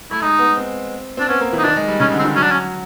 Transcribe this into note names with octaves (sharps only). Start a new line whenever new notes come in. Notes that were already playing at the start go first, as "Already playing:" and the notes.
A3 E4
G#3 D#4
B3
C4
C4 D4
B3 C#4
A#3
E3
D#4
D#3 D4
G#3
G3
C#3 C#4
D3
C4
D#3
F#3 C#4
D4
C#4